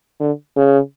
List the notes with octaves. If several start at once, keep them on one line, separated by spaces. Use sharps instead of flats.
D3
C#3